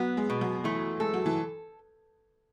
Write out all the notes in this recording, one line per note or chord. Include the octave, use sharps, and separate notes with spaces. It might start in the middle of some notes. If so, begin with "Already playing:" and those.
Already playing: F#3 B3
G#3
B2
F#3
E3 A3
G#3 A4
F#3
E3